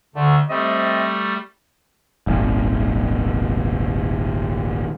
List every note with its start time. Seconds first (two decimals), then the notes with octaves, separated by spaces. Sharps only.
0.15 D2 D3 A3
0.49 G3 A3 C4 D#5 E5
2.27 D#1 G#1